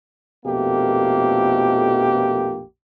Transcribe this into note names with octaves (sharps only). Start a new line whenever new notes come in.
A#1 F2 B2 A3 A#3 G4